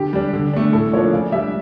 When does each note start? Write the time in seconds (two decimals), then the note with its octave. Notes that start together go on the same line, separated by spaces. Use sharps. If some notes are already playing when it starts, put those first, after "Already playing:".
Already playing: D3 G4
0.13 G3 D4
0.33 D3
0.53 A3 D4
0.73 A2 A4
0.93 F3 A#3 D4 C#5
1.13 C#3 D5
1.32 G3 D4 E5